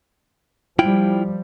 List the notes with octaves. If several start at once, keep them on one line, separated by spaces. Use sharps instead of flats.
F3 G3 E4 F4 G5